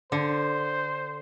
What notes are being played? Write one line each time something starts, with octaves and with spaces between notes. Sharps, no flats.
D3 C5